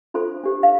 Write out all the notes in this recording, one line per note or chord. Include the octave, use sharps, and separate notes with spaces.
D4 F4 A4 C5 C6
D4 G4 C5
F5